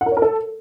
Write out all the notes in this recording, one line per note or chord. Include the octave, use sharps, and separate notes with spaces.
F#5
A#4
C#5
A#4
A4